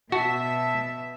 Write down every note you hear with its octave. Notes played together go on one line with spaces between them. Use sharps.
B2 F#4 E5 A5